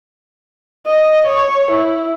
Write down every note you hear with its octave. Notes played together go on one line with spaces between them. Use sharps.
D#5
C#5
E4